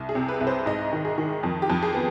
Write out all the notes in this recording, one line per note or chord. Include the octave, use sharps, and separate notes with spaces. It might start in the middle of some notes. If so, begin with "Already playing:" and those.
Already playing: C2
G#4
C3
B4
C2
C5
G#2 D#5
D#3
G#4
D#3
F2
G4
F2
G#4
B3